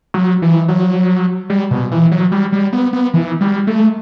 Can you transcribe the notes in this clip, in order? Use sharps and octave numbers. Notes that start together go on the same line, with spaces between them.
F#3
E3
F#3
G3
B2
E3
F#3
G3
G3
B3
B3
E3
G3
A3